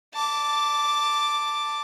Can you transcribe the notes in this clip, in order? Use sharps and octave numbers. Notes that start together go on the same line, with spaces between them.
A5 D6